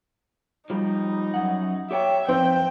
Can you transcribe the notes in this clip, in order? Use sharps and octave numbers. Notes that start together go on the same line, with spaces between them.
F3 G3 D#4
F#2 F#5
G4 C#5 E5 G5
F2 E3 C4 G5